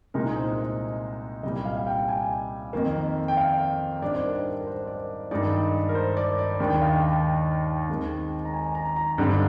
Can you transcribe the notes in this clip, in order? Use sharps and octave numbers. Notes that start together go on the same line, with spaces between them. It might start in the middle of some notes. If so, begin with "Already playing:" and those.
C2 A#2 G#3 D#4 A#4
C5
D#5
C2 A#2 G3 D#5
F5
F5
G5
G#5
F2 D#3 A#3
G5
F5
G#2 G3 D4 D5
C5
A#4
A#4
A#4
C5
D5
G2 D#3 G#3 D#4 D5
A#4
C5
D5
D5
D#2 D#3 G#3 D4
G5
F5
G5
D#2 D#3 G#3 C4
A#5
G#5
A#5
A#5
G2 D3 G3 C4 D#4 A#5